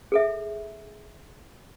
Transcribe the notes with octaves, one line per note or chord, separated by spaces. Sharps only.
G#4 A4 E5